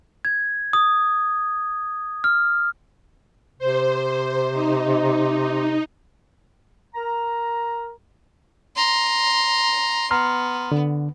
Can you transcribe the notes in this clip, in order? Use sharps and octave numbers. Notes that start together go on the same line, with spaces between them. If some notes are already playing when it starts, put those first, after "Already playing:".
G#6
D#6
F6
C3 C5
D#4
A#4 A#5
A#5 C6
B3 A#5 C6 F6
D3